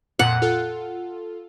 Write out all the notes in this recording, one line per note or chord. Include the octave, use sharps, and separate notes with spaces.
F2 A#2 F#5
F4 A4